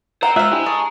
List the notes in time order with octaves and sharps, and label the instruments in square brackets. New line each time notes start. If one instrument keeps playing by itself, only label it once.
[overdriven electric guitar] C5 G5 [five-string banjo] F#5 [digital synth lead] A#5
[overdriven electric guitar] G#3 [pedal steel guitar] F4 F#5 [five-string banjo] C5 E5
[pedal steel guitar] D4 E4 G4 [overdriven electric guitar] D#5 G#5
[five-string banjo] G#4 [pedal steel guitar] A5 C#6